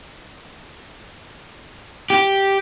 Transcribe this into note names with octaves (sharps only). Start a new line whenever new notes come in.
G4